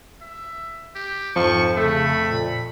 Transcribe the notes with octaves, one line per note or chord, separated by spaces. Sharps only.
E5
G4
F2 G#2 F3 C#6
C#3 A3 B5
A#2